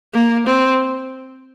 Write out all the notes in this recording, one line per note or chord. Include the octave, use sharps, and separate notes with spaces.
A#3
C4